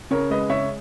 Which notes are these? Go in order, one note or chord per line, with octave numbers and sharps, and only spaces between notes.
C#3 A#4 C#5
G#3 B4 D#5
C#3 C#5 E5